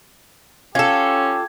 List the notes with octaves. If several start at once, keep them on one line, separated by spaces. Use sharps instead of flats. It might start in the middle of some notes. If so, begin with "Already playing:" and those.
C#4 F4 G4 A4 G#6